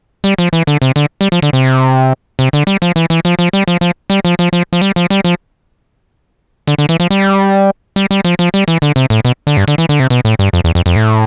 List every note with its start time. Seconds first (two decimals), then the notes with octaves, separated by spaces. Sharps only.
0.24 G3
0.38 F3
0.53 E3
0.67 D3
0.82 C3
0.96 D3
1.21 G3
1.32 F3
1.42 D3
1.53 C3
2.39 C3
2.53 D3
2.67 G3
2.82 F3
2.96 E3
3.10 E3
3.25 F3
3.39 F3
3.53 G3
3.68 F3
3.81 F3
4.10 G3
4.25 F3
4.39 F3
4.53 F3
4.73 F3
4.82 G3
4.96 F3
5.10 G3
5.24 F3
6.67 D3
6.78 D3
6.89 E3
7.00 F3
7.10 G3
7.96 G3
8.11 G3
8.25 F3
8.39 F3
8.54 G3
8.68 E3
8.82 D3
8.96 C3
9.10 A2
9.25 B2
9.47 D3
9.57 G2
9.68 D3
9.78 E3
9.89 D3
10.00 C3
10.10 B2
10.25 A2
10.39 G2
10.53 F2
10.64 E2
10.75 F2
10.86 F2
10.96 A2